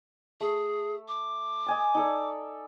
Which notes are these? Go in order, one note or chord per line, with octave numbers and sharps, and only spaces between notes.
A3 G#4
D6
D#5 G#5 A5
D#4 A4 D5